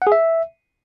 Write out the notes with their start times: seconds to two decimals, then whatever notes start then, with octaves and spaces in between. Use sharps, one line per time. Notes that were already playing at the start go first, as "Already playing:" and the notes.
0.02 F#5
0.07 G#4
0.12 E5